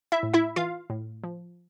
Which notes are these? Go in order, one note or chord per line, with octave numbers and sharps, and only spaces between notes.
E4 E5
A2
E4 E5
E3 F4 F5
A2
F3